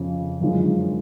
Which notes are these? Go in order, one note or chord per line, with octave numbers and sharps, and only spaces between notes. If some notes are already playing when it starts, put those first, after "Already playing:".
Already playing: F2 C#3 F3 C#4
F#2 D3 F3 G#3